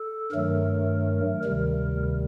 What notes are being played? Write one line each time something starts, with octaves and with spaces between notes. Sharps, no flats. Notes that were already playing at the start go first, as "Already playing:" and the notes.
Already playing: A4
G2 D#3 F#3 A3 A#4
D2 C3 D#3 G3 A#4